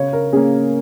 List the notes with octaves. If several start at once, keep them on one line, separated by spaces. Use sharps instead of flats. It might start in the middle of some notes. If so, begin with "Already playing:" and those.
Already playing: C#3 C#5
A#4
A#3 C#4 G#4